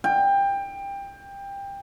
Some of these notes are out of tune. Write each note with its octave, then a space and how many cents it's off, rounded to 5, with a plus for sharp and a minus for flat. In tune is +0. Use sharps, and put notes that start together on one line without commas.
G5 +20